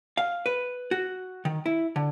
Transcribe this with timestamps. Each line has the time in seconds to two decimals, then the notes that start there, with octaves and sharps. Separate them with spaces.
0.17 F5
0.46 B4
0.91 F#4
1.45 D#3
1.66 E4
1.96 D3